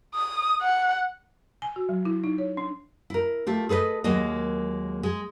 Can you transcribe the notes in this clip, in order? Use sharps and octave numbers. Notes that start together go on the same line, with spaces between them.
D#6
F#5
G#5
F#4
F#3
E4
D#4
C#5
D4
E4 A#4
A3 F4 G4
G#4 A4 B4 C5 D#5
D#2 F#3 G#3 A#3 D#5
G#3 G#4